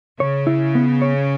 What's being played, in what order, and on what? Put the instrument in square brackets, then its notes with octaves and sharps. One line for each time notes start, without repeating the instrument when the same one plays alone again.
[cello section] C#3 [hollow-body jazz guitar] C#5
[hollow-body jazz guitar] E4
B3
C#5